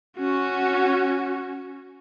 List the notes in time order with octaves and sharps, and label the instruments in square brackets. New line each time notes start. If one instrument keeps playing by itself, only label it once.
[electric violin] C#4 F#4